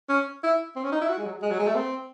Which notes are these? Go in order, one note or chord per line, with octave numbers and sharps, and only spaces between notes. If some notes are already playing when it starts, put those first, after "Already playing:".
C#4
E4
C4
C#4
D#4
E4
F#4
G#3
F#3
G#3
F#3
G#3
A3
C4